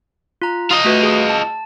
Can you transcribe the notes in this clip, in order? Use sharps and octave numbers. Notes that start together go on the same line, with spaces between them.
F4 A#5
F4 D#5 D#6
A3 F#4 B4
G#4
A5